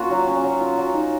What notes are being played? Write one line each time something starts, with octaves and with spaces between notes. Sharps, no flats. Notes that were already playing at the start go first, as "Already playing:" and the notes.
Already playing: A#3 C#4 F4 F#4
F#3
C#4
F#3
F4
F#3
D#4